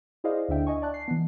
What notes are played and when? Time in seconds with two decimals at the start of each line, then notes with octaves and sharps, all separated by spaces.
0.24 E4 G#4 C5 D5 D#5 F5
0.49 D2 D3 D4 E5 G5
0.67 D#5 G#5 C#6
0.82 D5 A5 F#6
0.94 C7
1.08 E3 B3